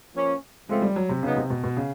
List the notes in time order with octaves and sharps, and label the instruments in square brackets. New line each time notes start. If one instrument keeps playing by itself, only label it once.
[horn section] F3 A#3 C#4
[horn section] C#3 F3 A3 C4 F4 [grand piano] G#3
[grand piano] G3
F#3
C3
[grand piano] C#3 [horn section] F#3 B3 D#4
[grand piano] C3
B2
B2
C#3